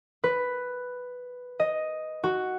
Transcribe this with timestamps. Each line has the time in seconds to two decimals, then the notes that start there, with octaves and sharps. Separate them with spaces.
0.24 B4
1.60 D#5
2.24 F#4